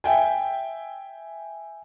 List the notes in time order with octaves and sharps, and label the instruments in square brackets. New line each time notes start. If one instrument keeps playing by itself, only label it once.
[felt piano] E5 G5 G#5